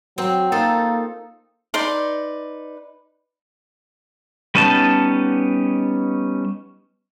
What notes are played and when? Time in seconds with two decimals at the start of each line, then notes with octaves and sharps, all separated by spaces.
0.18 F#3 C4
0.52 A#3 D#4 F4 A4
1.74 D#4 B4 D5 C6
4.55 G3 B3 C#4 D#4 A5